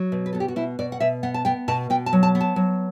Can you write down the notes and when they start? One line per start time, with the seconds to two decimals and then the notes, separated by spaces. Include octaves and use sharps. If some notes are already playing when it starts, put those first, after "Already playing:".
Already playing: F#3
0.12 B2
0.26 B4
0.33 B3 A4
0.40 G4
0.48 F#4
0.56 B2 E4
0.79 B2 D5
0.92 F#5
1.00 B2 E5
1.23 B3 F#5
1.34 A5
1.45 B3 G5
1.68 B2 A5
1.90 B2 G5
2.06 A5
2.13 F#3
2.23 A5
2.35 B3
2.41 A5
2.56 F#3